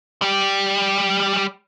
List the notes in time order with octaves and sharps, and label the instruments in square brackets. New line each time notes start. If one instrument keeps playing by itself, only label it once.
[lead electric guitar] G3 G4